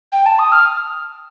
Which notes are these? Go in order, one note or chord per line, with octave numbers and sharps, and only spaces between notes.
G5
A5
D#6
F6